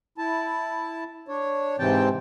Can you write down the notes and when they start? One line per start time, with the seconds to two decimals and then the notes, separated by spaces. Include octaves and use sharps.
0.18 E4 A5
1.28 D4 C#5
1.79 G#2 C3 E3 C4 G5 A5